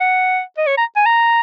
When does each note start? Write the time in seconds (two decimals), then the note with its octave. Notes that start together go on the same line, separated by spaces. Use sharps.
0.01 F#5
0.58 D#5
0.67 C#5
0.77 A#5
0.96 G#5
1.06 A#5